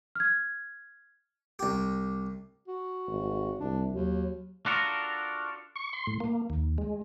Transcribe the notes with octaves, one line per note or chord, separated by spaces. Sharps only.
F6 G#6
C2 G4
F#4
G#1
C2 D4
D#2 F#3
D4 F4 F#4 A4 A#4
C#6
C6
A2
A#3
D#2
G#3